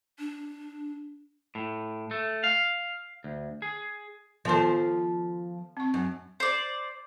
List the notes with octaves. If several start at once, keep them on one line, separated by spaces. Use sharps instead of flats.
D4
A2
A3
F5
D2
G#4
D#3 F3 B3 A4 C5
C4 C#6
F#2
C5 D5